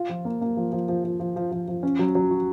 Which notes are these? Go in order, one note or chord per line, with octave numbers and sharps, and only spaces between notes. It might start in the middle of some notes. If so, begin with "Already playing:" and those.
Already playing: F4
F3
A#3
A#3
F3
F3
F3
F3
F3
F3
F3
F3
C#4
F#3
F#3
F#4